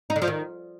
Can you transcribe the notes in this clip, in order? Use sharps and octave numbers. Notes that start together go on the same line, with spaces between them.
D#4
D3
F3
D#3